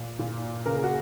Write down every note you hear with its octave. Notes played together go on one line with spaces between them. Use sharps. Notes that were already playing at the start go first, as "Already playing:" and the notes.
Already playing: A#2
A#2
C#3 A#4
G#4
F#4